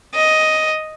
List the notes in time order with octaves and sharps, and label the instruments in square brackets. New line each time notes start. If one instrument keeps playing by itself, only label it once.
[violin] D#5